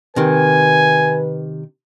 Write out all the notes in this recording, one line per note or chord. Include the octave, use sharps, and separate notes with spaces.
C3 D#3 B4 G#5